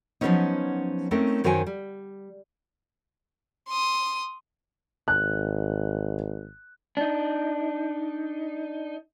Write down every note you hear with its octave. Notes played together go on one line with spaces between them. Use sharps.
F3 F#3 A#3 B3 C#4 D#4
A3 C4 C#4 D#4 A#4
F#2 D#3 F#4 C5 C#5 G#5
G3
C6 D#6
G#1 F#6
D4 D#4